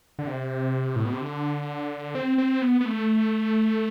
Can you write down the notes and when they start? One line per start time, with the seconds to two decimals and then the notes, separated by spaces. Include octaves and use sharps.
0.19 D3
0.27 C3
0.96 A2
1.05 B2
1.13 C3
1.21 D3
2.15 C4
2.38 C4
2.62 B3
2.81 B3
2.86 A3